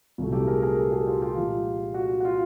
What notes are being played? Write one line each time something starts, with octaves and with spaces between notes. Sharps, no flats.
C2 A#2 F#3 A3
G4 A4
G#4 A#4
G#4 A#4
G4 A4
F#4 G#4
F4 G4
F4 G4
A#2 F3 G#3
F#4
F#4
F4